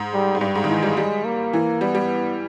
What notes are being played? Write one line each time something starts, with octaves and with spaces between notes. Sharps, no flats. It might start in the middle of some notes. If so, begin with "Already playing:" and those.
Already playing: G#2
G3
G#2
G2 G3
G#2
D#3
E3 G#3
G3
G3 G#3
A#3
E3
G3 B3
G3